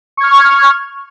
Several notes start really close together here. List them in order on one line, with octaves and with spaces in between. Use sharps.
C#6 G#6 F6